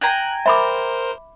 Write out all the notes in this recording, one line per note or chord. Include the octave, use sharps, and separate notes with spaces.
G5 G#5 A#5 F#6
A#4 C5 E5 B5 D6